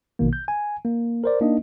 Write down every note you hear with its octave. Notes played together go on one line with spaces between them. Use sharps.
A#1 B2 D#3 A#3
G6
G#5
A#3
A#4 C5 D5
A#3 D4 D#4 D#5